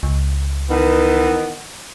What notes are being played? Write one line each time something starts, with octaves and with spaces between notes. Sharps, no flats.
C#2
D#3 E3 B3